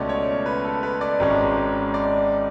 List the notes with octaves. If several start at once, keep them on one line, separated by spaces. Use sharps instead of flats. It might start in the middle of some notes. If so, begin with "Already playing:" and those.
Already playing: C#2 B2 A3 C#4 D5
C#5
B4
A4
B4
D5
G#1 G#2 G#3 C#4
D5